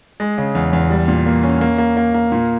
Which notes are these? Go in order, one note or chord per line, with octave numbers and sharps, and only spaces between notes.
G#3
C#3
E2
E2
G3
A#2
A#3
C#4
A#3
A#3
A#3
A#3
A#2